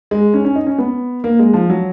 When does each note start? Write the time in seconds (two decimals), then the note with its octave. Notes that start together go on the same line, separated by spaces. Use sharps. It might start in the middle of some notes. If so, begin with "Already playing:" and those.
0.11 G#3
0.34 C#4
0.45 C#4
0.56 D#4
0.67 C#4
0.79 B3
1.24 A#3
1.39 G#3
1.54 F3
1.70 F#3